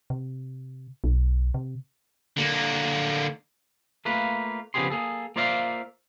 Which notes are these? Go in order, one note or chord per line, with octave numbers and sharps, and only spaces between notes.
C3
B1
C3
D3 A#3
A3 A#3 F4 B4
C#3 F3 B3 G4 G#4 C6
A#3 G#4 A4
A#3 F4 C5 D5 E5 F5